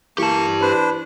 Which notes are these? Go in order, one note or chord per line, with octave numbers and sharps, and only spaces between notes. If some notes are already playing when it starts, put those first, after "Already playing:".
E3 A#3 G4 A5 C#6
D4 B4 C5